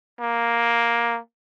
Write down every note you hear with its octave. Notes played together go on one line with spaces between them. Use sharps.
A#3